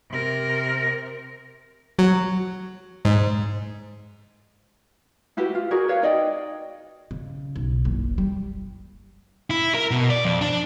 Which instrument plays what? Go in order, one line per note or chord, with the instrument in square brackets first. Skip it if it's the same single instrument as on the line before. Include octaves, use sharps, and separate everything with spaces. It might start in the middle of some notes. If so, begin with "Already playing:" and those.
[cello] C3 A#4
[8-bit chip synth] F#3
G#2
[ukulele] E4 F#4 G4 B4
F4
F#4 G#4 A#4 D5
B4 C#5 F5
D#4 D5 D#5 G5
[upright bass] C#3
B1
F#1
G3
[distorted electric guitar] E4
A#4
B2
D5
F2
D4